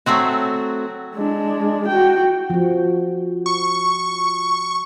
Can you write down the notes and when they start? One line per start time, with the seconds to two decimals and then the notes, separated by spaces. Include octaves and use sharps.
0.06 F#3 A3 C4 F#4
1.15 G#3 D4
1.88 F#4 G5
2.50 F3 F#4
3.46 C#6